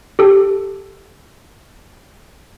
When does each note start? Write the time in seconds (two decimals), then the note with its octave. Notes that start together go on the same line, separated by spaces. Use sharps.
0.19 G4 A4